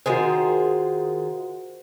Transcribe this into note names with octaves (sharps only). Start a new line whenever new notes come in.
D#3 F4 F#4 G#4 C5